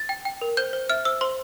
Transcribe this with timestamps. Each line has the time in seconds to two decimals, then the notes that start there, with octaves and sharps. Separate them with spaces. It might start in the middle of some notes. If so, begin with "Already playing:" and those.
Already playing: A6
0.09 G5
0.25 G5
0.41 A#4
0.57 C5 G6
0.73 C5
0.90 E5 F6
1.05 C5 E6
1.21 C5 C6